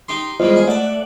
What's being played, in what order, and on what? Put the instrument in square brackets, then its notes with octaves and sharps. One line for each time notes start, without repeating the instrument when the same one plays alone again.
[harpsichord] D#4 G4 C6
[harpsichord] E2 G3 G#3 [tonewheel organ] F4 C5 D#5
[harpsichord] G#4
[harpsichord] A3 A5 [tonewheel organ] D5 F#5